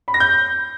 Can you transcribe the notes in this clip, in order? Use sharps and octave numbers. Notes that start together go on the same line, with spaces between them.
B5
A#6
G6